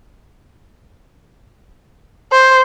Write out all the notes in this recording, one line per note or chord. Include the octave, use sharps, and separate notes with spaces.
C5